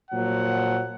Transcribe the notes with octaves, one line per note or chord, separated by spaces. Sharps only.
A#2 F3 F#3 F#5